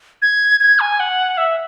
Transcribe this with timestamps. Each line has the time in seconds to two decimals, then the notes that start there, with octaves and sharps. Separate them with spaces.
0.22 G#6
0.61 G#6
0.80 G#5
1.00 F#5
1.38 E5